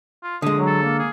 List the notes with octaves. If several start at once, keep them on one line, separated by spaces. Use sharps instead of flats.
F4
D3 G#3 D#6
F#3
A4
A#3
G#4